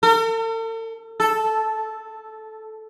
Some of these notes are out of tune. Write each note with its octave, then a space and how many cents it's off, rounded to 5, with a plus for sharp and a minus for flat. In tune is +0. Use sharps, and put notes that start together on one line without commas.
A4 +45
A4 -10